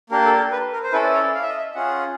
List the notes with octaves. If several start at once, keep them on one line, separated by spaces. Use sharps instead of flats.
A#3 D4 G4 A#4
A4
A#4
B4
A#4
C5
C#4 E4 A4 B4
D5
C#5
D5
F5
E5
D#5
E5
C#4 F4 G#4 F#5